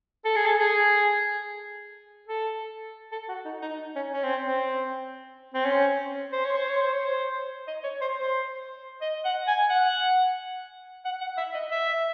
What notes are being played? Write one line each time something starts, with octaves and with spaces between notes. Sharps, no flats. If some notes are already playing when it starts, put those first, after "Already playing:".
A4
G#4
A4
G#4
A4
A4
F#4
D#4
D#4
C#4
C#4
C4
C4
C4
C#4
C5
C#5
C5
C#5
C5
C#5
C5
D#5
C#5
C5
C5
D#5
F#5
G#5
F#5
F#5
F#5
E5
D#5
E5